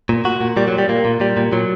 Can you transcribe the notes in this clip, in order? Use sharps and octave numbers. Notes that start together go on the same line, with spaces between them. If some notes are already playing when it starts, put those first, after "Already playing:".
A#2
A#2 F#4
A#2
A#2 G3
F#3
A#2
G3
A#2 A#3
A#2
A#2 G3
A#2
A#2 F#3